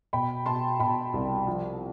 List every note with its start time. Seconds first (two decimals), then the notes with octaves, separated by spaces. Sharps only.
0.13 B2 G5 B5
0.46 B2 A5 C6
0.80 B2 G5 B5
1.13 C2
1.47 F3